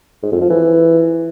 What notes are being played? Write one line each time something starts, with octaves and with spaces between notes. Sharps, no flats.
G#2
F2
F3
E3